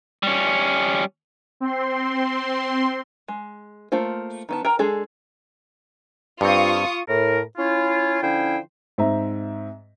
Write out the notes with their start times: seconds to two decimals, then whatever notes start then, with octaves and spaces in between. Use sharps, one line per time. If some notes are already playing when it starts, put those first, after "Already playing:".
0.23 G3 C#4
1.60 C4 C6
3.28 G#3
3.92 A3 A#3 F4 C5
4.49 D#3 B3 A5
4.65 A#4 G5 A#5
4.79 G#3 D4 G#4 A4
6.41 G2 C4 F4 C#6 D#6
7.08 A2 A#4
7.57 C#4 E4 F4
8.22 D3 F3 C#4 E4 C5 G5
8.98 G#2 C4 E5 A#5